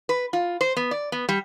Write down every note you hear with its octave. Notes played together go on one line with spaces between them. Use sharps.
B4
F4
C5
B3
D5
B3
G3